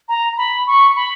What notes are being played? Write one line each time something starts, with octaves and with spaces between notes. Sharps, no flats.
A#5
B5
C#6
B5